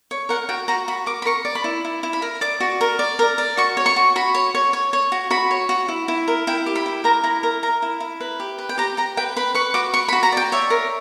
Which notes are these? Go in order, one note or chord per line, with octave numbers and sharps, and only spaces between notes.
C#5
A#4 F#5
F#4 G5
F#4 A#5
F#4 B5
A#4 D6
B5
A#4 C#6
D5
B5
E4
E4
E4
B5
A#4
D5 D6
F#4
A#4
D5
A#4
D5
F#4 C#6
C#5
C#6
F#4
F#4 B5
C#5
C#5
C#5
C#5
F#4
F#4 B5
C#5
F#4
E4
E4
A#4
E4 G5
G4
B5
E4
A#4 A#5
E4 A#5
A#4
A#4 A#5
E4
E4
B4
G4
B4
G5
G4 A#5
G4 A#5
B4 G5
B4 B5
B4 C#6
F#4 D6
B4 C#6
B5
F#4
A#5
D5 G5
C#5 E5
A#4